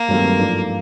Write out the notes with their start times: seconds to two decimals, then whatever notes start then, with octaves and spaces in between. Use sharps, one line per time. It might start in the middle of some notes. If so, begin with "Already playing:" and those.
Already playing: A#3
0.08 G2 D#3 F#3 A3 C4
0.38 G#2 F3 A3 D4